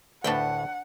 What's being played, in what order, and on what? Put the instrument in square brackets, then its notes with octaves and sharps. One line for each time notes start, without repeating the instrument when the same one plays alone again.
[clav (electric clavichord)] D2 A2 [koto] D4 B4 G5 [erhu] F#5